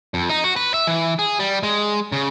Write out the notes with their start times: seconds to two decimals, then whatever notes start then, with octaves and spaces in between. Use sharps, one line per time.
0.14 F2
0.29 D#4
0.44 F#4
0.56 B4
0.74 E5
0.87 E3
1.19 G#4
1.39 G3
1.63 G#3
2.12 C#3